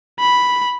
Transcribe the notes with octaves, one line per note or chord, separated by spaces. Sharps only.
B5